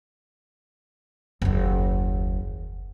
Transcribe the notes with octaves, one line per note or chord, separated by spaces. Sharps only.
F#1 D#2